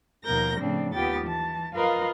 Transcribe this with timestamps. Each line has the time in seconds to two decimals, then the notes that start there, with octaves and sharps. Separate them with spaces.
0.24 D#2 B2 F3 A#4 G6 A#6
0.60 A2 C#3 F3 C4 D4
0.93 D#2 B3 F4 G4 G5 A6
1.26 E3 A5
1.75 F4 A#4 B4 D#5 F5